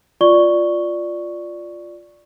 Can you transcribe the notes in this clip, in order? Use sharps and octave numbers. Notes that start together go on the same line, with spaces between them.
F4 D5 C#6 G7